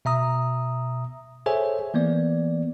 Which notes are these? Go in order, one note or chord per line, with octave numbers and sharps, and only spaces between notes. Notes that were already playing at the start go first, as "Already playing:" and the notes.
B2 E5 A#5 D#6
G#4 A4 C5 C#5 E5 G#5
E3 A#3 B3 D5